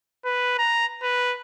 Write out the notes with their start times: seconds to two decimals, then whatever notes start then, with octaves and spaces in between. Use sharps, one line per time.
0.25 B4
0.59 A#5
1.03 B4